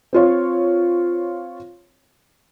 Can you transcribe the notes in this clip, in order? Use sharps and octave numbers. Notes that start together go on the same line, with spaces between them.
C4 F4 C#5